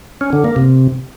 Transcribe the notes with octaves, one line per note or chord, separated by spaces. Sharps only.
C#4
D3
A#3
C3